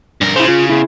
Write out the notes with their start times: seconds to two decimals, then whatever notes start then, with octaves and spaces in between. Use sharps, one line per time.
0.21 G2 A#4
0.36 C#3 E4 C5
0.48 F4
0.69 E4 G#4